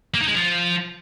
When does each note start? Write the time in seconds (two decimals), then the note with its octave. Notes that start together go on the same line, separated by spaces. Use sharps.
0.14 A#3
0.21 D#4
0.27 G#3
0.34 F3